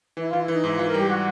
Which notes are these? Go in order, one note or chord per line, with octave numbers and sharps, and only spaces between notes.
E3 E4
E3 F4
E4
E3 D#4
G#2 E4
E3 F4
A#4
G3 G4
F#4